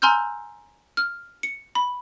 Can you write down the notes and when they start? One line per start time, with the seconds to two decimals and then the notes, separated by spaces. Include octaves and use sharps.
0.02 G#5 A#5 C6 E6 F6 G6
0.97 F6
1.43 C#7
1.75 B5